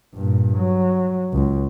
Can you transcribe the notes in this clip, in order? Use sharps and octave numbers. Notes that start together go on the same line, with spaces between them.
G2 A#2
F#3
C#2